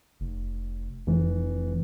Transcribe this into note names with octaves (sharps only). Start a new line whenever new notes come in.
F1
F1 E3